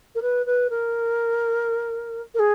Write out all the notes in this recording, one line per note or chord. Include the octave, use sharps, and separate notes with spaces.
A#4
B4
B4
A#4
A#4
G#4